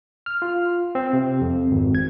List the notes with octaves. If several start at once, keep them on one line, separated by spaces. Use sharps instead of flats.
F6
F4
C4
C3
F2
G#1
G#6